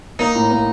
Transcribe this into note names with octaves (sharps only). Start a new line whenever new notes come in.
A#3 D#4
A2
A#3